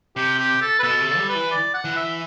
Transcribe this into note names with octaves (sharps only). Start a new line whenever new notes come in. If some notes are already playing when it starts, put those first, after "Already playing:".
C3 G4
G4
A4
B4
B2 A4
C3
A4
G3
B4
E3
D5
F#5
E3
E5